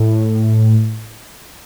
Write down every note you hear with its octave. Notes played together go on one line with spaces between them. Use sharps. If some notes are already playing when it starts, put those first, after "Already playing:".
Already playing: A2